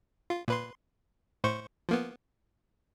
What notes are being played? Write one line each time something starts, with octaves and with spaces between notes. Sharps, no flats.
F4
A#2 B4 C6
A2 C5 C#6
F3 A#3 B3